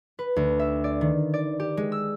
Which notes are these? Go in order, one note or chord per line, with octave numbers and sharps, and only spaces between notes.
B4
D2
E5
D5
D#3
D5
G4
G#3
E6